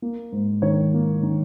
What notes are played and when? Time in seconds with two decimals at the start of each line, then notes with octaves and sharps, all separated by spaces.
0.02 A#3
0.32 G#2
0.62 D#3 C#5
0.94 A#3
1.23 D#3